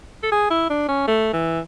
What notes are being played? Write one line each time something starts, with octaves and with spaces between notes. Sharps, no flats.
A4
G#4
E4
D4
C#4
A3
E3